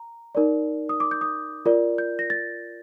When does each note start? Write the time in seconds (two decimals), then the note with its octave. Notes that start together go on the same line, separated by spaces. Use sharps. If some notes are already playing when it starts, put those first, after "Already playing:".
Already playing: A#5
0.35 D#4 A#4 D5
0.89 D#6
1.00 D6
1.11 G6
1.21 D#6
1.66 F4 A#4 D5
1.98 G6
2.19 A#6
2.30 A6